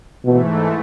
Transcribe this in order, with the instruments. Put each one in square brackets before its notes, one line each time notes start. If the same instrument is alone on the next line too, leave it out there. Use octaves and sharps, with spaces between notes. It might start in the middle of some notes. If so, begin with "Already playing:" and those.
[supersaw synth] G#2 E3 A3 [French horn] B2